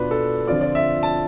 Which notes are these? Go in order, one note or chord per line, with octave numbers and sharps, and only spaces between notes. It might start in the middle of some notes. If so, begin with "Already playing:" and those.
Already playing: B2 B3 D4 F4 B4
A4
D3 F3 C4 F4 D5
D5
E5
A5